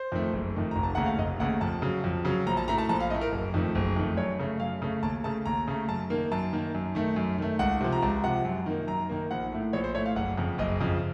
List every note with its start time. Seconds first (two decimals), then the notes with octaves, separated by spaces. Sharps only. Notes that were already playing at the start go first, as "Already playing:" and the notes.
Already playing: C5
0.12 F2 D#3 A3
0.33 F#1
0.55 F2 D#3 A3
0.71 F1 A#5
0.83 A5
0.95 D#2 C#3 A3 F#5
1.06 F5
1.18 F1 D#5
1.40 D#2 C#3 A3 F#5
1.61 F2 A5
1.82 C#3 F#3
2.04 F2
2.25 C#3 F#3
2.46 A#1 A#5
2.57 A5
2.68 A2 A3 A#5
2.78 A5
2.89 A#1 A5
3.00 F5
3.10 A2 A3 D#5
3.21 A#4
3.32 F#1
3.54 F2 D#3 A3
3.75 F#1
3.96 F2 D#3 A3
4.17 F#2 C#5
4.39 C#3 A3
4.60 F#2 F5
4.82 C#3 A3
5.03 D#2 A5
5.24 C#3 A3 A5
5.46 D#2 A#5
5.68 C#3 A3
5.88 F#2 A5
6.10 D#3 A#3
6.32 F#2 A5
6.53 D#3 A#3
6.75 F#2
6.95 D#3 A3
7.16 F#2
7.38 D#3 A3
7.59 C#2 F#5
7.81 C3 F3
7.92 A#5
8.03 C#2 A5
8.23 C3 F3 F#5
8.45 F#2
8.66 D#3 A#3
8.87 F#2 A#5
9.09 D#3 A#3
9.31 A#1 F#5
9.52 A2 A3
9.73 A#1 C#5
9.84 C5
9.95 A2 A3 C#5
10.06 F5
10.16 F#1 F#5
10.38 F2 C#3
10.58 F#1 D#5
10.80 F2 C#3